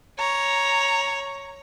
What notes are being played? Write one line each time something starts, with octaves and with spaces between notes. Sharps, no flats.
C#5 A#5